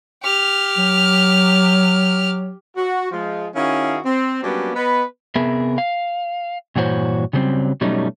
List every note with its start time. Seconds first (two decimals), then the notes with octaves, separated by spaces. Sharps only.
0.23 G4 F6
0.78 F#3
2.77 F#4
3.12 F3 G#3 F4
3.56 D#3 C#4 E4 F#4 G#4 F5
4.05 C4
4.43 F#3 G3 A#3 B3 C#4 D4
4.75 B3 B4 D#5
5.36 C3 B3 G#4 A#4 E5
5.78 F5
6.76 G2 A#2 E3 F#4 C5 C#5
7.33 C#3 F#3 G3 B3 C4
7.81 B2 F#3 G3 A3 C#4 D#4